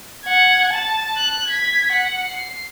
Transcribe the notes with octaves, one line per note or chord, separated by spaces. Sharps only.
F#5 G#6
A5
F#6
G#6 B6
F#5
C7